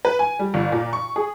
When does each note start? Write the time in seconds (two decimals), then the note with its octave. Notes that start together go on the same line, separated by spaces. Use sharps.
0.05 B4
0.19 G#5
0.39 G3
0.54 G1
0.72 A#2
0.93 C#6
1.16 G#4